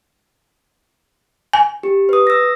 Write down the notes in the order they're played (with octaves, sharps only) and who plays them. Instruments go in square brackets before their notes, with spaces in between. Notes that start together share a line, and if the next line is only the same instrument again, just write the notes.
[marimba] G#5
[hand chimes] G4
B4 D#6
E6 A#6